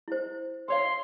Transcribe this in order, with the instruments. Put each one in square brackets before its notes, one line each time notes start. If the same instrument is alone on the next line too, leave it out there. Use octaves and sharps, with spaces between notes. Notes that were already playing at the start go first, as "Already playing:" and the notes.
[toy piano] E4 C5
[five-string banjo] A4 C#5 F5 [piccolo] C6